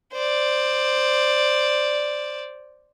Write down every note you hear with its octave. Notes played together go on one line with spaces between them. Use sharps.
C5 D5